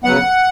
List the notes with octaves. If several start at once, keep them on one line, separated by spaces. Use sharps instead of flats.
C#3 F#3 B3 F#5